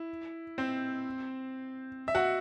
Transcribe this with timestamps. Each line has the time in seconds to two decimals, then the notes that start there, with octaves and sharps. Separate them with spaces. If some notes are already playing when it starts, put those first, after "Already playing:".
Already playing: E4
0.58 C4 C5
2.08 E5
2.15 F#4 F#5